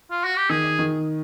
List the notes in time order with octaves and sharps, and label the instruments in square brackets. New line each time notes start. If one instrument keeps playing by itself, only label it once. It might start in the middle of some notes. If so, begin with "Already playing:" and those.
[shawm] F4
F#4
G4
[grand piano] D#3 [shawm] G#4
[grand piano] D#3